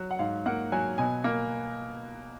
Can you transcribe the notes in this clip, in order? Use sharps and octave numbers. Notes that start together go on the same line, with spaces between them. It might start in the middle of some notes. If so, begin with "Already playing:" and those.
Already playing: F#3
F#5
G#2 F5
A#3 F#5
F#3 G#5
B2 G#5
A#3